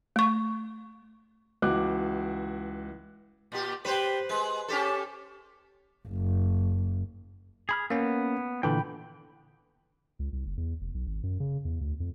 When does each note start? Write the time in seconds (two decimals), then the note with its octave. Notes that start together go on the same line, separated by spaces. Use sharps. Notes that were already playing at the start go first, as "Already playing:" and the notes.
0.16 A3 C#6
1.62 C#2 E3 F#4 D6 F#6
3.52 A#2 G4
3.85 G3 B4 C5 G5
4.29 G#3 B4
4.68 C#4 G4 A4
6.08 F#1
7.69 G#4 B5 F6
7.90 A#3 B3 C#4
8.63 A#2 D3 E3 G5 B5
10.19 C#2
10.33 C2
10.46 F#1
10.57 E2
10.81 F1
10.95 B1
11.07 G#1
11.23 F#2
11.40 C#3
11.65 E2
11.81 D2
12.00 F2